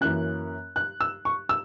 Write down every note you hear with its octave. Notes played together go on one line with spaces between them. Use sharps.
F#2 E3 A#3 C#4 F#6
F#6
E6
C#6
E6